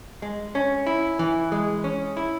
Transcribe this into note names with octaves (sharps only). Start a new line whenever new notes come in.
G#3
C#4
E4
E3
G#3
C#4
E4